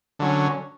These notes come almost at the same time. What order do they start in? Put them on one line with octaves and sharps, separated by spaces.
D3 F#3 C#4